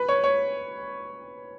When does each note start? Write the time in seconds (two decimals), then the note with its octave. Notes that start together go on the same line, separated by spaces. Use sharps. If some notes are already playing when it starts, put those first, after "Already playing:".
Already playing: B4
0.09 C#5
0.24 C#5